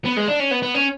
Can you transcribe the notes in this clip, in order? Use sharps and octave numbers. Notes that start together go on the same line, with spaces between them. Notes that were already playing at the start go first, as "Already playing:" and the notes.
B3
G#3
D4
C#4
B3
B3
C#4